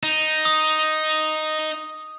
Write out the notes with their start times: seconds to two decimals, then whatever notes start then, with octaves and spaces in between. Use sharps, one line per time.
0.03 D#4
0.45 D#6